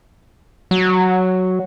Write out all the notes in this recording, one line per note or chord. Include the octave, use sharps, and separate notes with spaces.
F#3